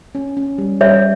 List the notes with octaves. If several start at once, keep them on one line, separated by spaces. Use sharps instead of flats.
C#4
C#4
G3
G3 C#5 E5